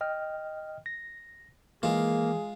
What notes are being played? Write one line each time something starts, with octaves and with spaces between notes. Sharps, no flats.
D#5 G5 F6
A#6
E3 G#3 A#3 F4 G#4